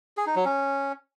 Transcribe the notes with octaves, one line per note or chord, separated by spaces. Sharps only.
G#4
D#4
F#3
C#4